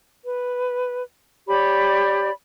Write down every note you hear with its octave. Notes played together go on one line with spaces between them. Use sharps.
B4
G4 C#5 D5 B5